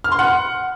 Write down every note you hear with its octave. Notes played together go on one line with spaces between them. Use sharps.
F6
C6
F#5